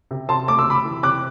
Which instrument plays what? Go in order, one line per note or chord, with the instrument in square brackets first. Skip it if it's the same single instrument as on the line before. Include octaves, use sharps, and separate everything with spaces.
[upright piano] C3
C3 A5 C6
A3 D6
E6
C3 B5 D6
E3
C3 D6 F#6